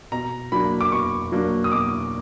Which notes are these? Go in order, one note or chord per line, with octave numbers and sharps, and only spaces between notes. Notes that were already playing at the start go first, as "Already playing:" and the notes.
B2 A#5
F#3 A#3 D4 B5
D6
B2 C#6
F#3 A#3 D4
D#6
B2 D6